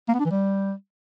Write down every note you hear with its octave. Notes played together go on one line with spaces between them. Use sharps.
A#3
B3
D4
E3
G3